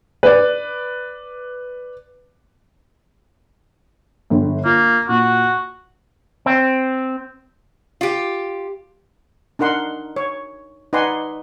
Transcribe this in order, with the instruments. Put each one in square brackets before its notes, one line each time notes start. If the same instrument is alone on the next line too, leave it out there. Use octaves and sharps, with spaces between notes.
[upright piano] B4 D5
[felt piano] G1 D3 G3
[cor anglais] A#3 [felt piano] F4
[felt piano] A#2 [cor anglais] F#4
[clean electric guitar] C4
[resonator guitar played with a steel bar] F4 G4
[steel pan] D4 D#4 A#4 F#5 C6
C#5
D#4 B4 D5 F#5 G#5 C6